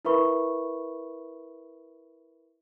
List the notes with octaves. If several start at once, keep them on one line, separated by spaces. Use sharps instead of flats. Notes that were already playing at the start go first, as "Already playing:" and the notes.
E4 A#4 B4 E5 B5 C#6